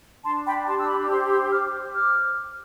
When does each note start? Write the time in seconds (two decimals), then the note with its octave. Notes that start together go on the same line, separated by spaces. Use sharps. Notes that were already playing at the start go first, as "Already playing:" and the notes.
0.24 D4 A5 C6
0.46 G5 B5
0.66 G4 A5 C6
0.80 E6
0.87 B5 D6
1.09 C5 C6 E6
1.29 C6 E6
1.51 C5 D6 F6
1.92 C5 D6 F6